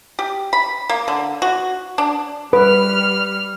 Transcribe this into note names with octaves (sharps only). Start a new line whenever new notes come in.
G4
B5
A#3
D3
F#4
D4
G3 B4 F6